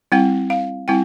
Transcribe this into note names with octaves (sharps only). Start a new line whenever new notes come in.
G3 C4 E4 G5
F5
G3 C4 E4 G5